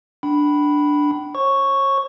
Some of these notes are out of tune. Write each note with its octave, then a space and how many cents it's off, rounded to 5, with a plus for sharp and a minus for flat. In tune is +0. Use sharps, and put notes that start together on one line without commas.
D4 +0 G5 -40 B5 +0
C#5 -40 C#6 +0